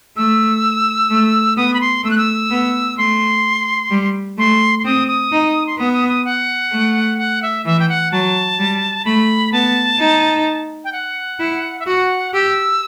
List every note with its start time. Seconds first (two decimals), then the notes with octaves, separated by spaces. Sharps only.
0.17 A3 E6
1.10 A3
1.57 B3 D#6
1.74 B5
1.81 C6
2.04 A3 E6
2.11 F#6
2.18 E6
2.51 B3
2.97 A3 C6
3.91 G3
4.37 A3 C6
4.79 C6
4.85 C4 D#6
5.08 D#6
5.32 D#4
5.67 C6
5.78 B3 D#6
5.93 D#6
6.09 D#6
6.25 F#5
6.72 A3
7.18 F#5
7.43 E5
7.65 E3 E5
7.80 G5
7.89 F#5
8.12 F#3 A5
8.59 G3
9.05 A3 B5
9.52 B3 A5
9.99 D#4
10.84 G5
10.93 F#5
11.40 E4
11.80 E5
11.86 F#4 F#5
12.34 G4 E6